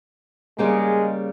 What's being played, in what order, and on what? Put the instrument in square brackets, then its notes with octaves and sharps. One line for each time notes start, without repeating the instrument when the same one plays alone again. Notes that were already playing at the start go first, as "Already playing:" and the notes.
[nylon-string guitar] C#3 G3 A#3 [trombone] G#3